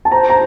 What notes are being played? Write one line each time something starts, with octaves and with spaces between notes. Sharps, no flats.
A5
C5 A#5
A#5